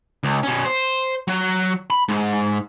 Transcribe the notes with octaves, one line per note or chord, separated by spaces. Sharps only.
C#2
B2 C#4
C5
F#3 F#4
B5
G#2